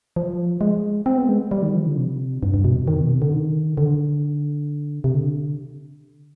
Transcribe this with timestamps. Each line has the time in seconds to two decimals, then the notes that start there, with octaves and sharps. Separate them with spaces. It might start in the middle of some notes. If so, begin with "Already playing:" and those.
0.16 F3
0.61 G#3
1.06 C4
1.17 B3
1.29 G#3
1.51 G3
1.63 D#3
1.74 F3
1.86 D3
1.98 C3
2.43 G2
2.54 G2
2.65 B2
2.76 F2
2.88 D#3
3.00 B2
3.11 C3
3.22 D3
3.33 D#3
3.78 D3
5.04 C3
5.14 D3